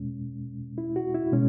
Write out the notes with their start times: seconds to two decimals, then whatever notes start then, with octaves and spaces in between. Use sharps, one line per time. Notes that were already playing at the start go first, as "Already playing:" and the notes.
Already playing: E2 B2 G#3 C#4
0.78 E4
0.96 F#4
1.15 E4
1.32 B2 G#3 C#4